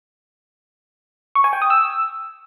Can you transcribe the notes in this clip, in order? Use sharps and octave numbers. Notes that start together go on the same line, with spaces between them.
C#6
G#5
G5
D#6
E6